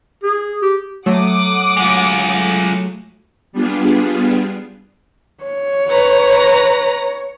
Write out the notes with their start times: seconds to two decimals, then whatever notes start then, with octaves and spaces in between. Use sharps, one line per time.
0.23 G#4
0.62 G4
1.06 F#3 A3 F#5 D6 D#6
1.77 G#3 F4
3.53 G3 B3 D4 F4 G#4
5.44 C#5
5.89 B4 A#5